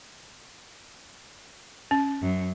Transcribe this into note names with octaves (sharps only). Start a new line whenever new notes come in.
C#4
F#2